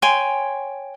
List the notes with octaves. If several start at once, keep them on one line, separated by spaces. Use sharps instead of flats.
C#5 G5 G#5 C6